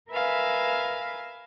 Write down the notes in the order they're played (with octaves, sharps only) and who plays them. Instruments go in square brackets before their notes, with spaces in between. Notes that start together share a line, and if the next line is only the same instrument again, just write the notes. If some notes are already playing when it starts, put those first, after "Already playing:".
[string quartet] A#4 B4 E5 F5 G#5